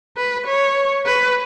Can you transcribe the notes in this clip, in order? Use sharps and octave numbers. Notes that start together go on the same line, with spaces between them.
B4
C#5
B4